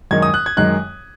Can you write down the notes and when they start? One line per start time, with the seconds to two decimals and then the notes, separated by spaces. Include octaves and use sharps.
0.11 F#2 D#3 G#3 D#4 G#6
0.22 D#6
0.34 F#6
0.46 G#6
0.57 F#2 D#3 G#3 D#4 F#6